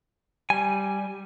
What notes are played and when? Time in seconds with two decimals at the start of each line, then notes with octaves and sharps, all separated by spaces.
0.50 G3 G#5